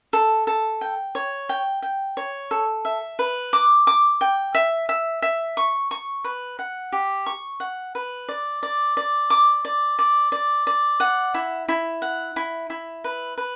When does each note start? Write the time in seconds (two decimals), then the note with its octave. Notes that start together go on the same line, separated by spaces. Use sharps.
0.13 A4
0.47 A4
0.81 G5
1.15 C#5
1.49 G5
1.82 G5
2.17 C#5
2.51 A4
2.85 E5
3.19 B4
3.53 D6
3.87 D6
4.21 G5
4.55 E5
4.89 E5
5.22 E5
5.57 C#6
5.91 C#6
6.24 B4
6.59 F#5
6.92 G4
7.26 C#6
7.60 F#5
7.95 B4
8.29 D5
8.63 D5
8.97 D5
9.30 D6
9.65 D5
9.99 D5
10.32 D5
10.67 D5
11.00 F#5
11.34 E4
11.68 E4
12.02 F#5
12.36 E4
12.70 E4
13.04 B4
13.37 B4